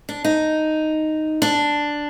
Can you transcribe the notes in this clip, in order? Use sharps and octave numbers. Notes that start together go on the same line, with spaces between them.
D4
D#4
D4